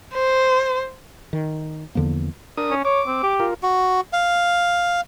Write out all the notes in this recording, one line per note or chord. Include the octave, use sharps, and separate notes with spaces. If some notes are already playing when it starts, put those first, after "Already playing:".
C5
D#3
E2 D3 F3 A#3
D4 A#4 D#6
C#4
C#5 D6
C4
G4
F4 A#4
F#4
F5